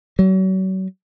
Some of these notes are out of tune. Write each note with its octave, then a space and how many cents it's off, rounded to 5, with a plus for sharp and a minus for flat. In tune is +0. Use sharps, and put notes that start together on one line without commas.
F#3 +35